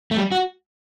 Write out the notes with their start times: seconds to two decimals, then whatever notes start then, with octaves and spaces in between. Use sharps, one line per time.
0.11 A3
0.17 G3
0.32 F#4